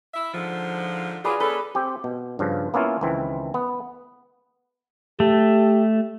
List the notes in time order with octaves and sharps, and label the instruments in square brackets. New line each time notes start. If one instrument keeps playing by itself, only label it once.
[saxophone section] E4 E5
G#2 D3 F3
[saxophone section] F#3 F4 [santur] G#4 B4 D5
[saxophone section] A#3 C#4 A4 [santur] B4
[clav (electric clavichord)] C4 G4
B2
G2 C#3 F3
A#3 B3 C#4 E4 F4
C#2 D#3 E3 C4
B3
[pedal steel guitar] A3 [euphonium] G4